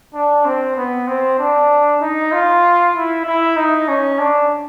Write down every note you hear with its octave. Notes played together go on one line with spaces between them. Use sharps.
D4
C4
B3
C4
D4
D#4
F4
E4
E4
D#4
C#4
D4